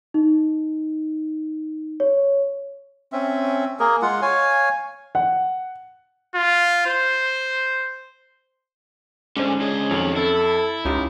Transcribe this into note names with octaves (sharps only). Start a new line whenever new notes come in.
D#4
C#5
C4 C#4 E5
A#3 G#4 A#4
G#3 F4 F#5
C#5 F5 G#5
F#5
F4
C5
G#2 D3 G#3 C#4 D4 C5
C#2 G#4 D#5
F2 D#3 F#3
E4 A4
C#2 C#4 D#4 F4 G4